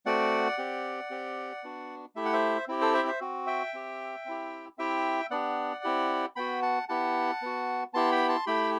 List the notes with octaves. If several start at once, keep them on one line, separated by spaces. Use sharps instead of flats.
A3 C4 F#4 D5 F#5
C4 G4
C4 G4
B3 D4 F#4
A3 E4 G4 E5
F#5
C5 E5
C4 E4 G4
A4 C5
C5 E5
C5 E5
C4 F#4
E5 G5
C4 G4
C4 E4 G4
C4 E4 G4 E5 G5
B3 D4 G4 D5 F#5
C4 E4 G4
B3 F#4 G5 B5
F#5 A5
B3 E4 G4 F#5 A5
B3 F#4
B3 E4 G4 A5 C6
G5 B5
A5 C6
A3 E4 G4 G5 B5